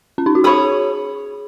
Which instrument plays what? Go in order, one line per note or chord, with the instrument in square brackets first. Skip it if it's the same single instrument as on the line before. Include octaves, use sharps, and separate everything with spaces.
[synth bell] C#4
D#4
F#4
[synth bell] G#4 [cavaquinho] C#5 B5 D#6